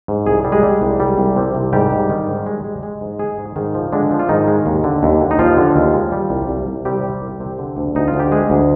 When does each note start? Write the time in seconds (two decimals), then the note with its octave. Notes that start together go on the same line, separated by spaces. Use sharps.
0.08 G#2
0.26 C2 G#4
0.44 G3
0.52 G#3 G#4
0.63 G3
0.82 C2
1.00 G3
1.18 C2
1.36 C3
1.55 C2
1.73 G#2 G3 G4
1.91 G#2
2.09 D#3
2.27 G#2
2.46 G#3
2.64 G#3
2.83 G#3
3.01 G#2
3.19 G#3 G#4
3.38 G#2
3.56 G#2 D#3 D#4
3.75 F3
3.92 D3 G#3 D4
4.11 F3
4.19 F4
4.29 G#2 D#3 D#4
4.48 G#3
4.66 D#2
4.84 D3
5.03 D#2
5.21 D3
5.31 D#4
5.39 D#2 F3 F4
5.57 D3
5.76 D#2
5.94 G#3
6.12 G3
6.30 C2
6.49 C2
6.67 C2
6.85 C3 G3 G4
7.03 G3
7.22 C2
7.40 C3
7.58 D3
7.77 D2
7.95 D2 D#4
8.08 F4
8.14 D2
8.20 G4
8.32 G#3 G#4
8.50 D2